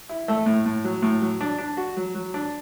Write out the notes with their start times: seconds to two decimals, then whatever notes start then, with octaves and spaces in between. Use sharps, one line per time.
0.09 E4
0.28 A3
0.46 A2
0.66 A2
0.84 F#3
1.02 A2
1.21 F#3
1.41 D4
1.58 D4
1.77 F#4
1.97 F#3
2.15 F#3
2.34 D4